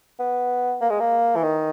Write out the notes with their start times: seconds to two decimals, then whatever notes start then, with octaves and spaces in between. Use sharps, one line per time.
0.19 B3
0.81 A#3
0.90 G#3
1.00 A#3
1.36 E3
1.43 D#3